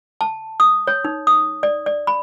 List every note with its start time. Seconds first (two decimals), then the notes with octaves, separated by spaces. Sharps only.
0.21 A5
0.60 D#6
0.87 C#5
1.05 D#4
1.27 D#6
1.63 D5
1.86 D5
2.07 B5